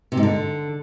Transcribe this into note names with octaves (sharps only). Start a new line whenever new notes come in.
C3
G#2
D3